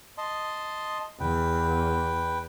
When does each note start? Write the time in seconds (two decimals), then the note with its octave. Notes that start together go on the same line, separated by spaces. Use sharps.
0.18 D#5 A5 C6
1.20 E2 B4 G5